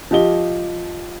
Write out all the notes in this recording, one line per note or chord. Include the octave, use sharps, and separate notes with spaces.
F3 G4 D#5 G7